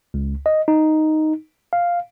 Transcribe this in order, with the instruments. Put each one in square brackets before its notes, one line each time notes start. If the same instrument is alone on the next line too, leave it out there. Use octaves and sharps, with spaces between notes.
[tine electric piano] C#2
D#5
D#4
F5